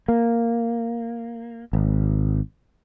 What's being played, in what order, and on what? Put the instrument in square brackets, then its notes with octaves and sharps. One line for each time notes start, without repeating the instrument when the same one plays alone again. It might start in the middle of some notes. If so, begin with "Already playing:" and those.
[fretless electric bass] A#3
G#1